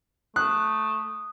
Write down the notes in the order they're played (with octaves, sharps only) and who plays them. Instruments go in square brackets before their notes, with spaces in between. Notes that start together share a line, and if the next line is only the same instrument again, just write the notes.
[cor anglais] A3 [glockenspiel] D#6 [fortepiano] F#6